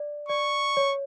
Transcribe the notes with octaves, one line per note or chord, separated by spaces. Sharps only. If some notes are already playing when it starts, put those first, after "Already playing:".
Already playing: D5
D5 C#6
C#5